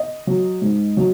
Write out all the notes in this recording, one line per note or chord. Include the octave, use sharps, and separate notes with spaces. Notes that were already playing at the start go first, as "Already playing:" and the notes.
Already playing: D#5
F#3
G#2
F#3